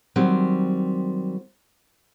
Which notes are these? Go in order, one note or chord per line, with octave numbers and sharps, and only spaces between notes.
D#3 F#3 G3 C4